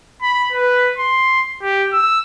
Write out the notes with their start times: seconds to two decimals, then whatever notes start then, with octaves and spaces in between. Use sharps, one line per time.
0.22 B5
0.52 B4
0.98 C6
1.62 G4
1.93 E6